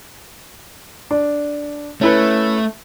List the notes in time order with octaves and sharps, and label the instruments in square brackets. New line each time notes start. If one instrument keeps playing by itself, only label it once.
[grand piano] D4
[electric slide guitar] A3 [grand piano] C#4 E4 B4